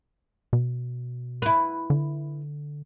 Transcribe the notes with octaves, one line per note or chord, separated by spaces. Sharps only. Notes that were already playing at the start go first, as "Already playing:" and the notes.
B2
E4 B4
D3